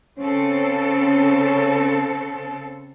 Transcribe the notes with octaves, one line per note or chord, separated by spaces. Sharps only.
C#3 C4 C#4 A4